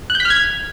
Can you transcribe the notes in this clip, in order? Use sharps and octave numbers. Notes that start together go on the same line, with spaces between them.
F#6
G6
B6
F6
G#6